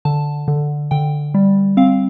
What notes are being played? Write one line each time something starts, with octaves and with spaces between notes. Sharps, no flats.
D3 A5
D3
D3 G5
G3
C4 F5